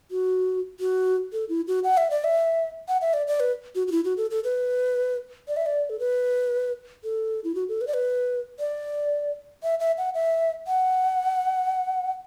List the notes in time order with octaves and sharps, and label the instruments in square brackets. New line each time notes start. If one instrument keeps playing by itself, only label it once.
[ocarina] F#4
F#4
A4
E4
F#4
F#5
E5
D5
E5
F#5
E5
D5
D5
B4
F#4
F#4
E4
F#4
A4
A4
B4
D5
E5
D5
A4
B4
A4
E4
F#4
A4
B4
D5
B4
D5
E5
E5
F#5
E5
F#5